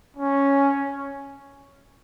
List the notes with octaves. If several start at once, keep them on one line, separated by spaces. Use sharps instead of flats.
C#4